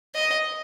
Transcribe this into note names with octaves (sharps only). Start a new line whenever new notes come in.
D#5